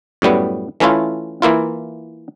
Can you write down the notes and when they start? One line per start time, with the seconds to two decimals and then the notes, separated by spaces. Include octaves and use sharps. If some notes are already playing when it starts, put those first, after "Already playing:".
0.22 F#2 A2 G3 B3
0.80 E3 A3 C#4 E4 F4
1.42 E3 A#3 E4 F4